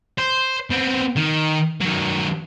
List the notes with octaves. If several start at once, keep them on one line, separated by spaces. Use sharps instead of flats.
C5
B3 C4
D#3
D#3 F#3